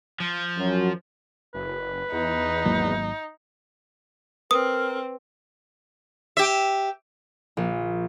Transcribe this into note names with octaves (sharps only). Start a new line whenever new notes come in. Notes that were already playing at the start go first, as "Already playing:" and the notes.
F3
F#2 F#3
F#1 B4
E2 D#4
G#1 F#3 A#3
C4 A#4 B4 D#6
G4 E5
A#1